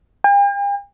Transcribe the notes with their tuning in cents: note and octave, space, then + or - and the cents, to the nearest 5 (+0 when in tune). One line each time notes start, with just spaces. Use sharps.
G5 +45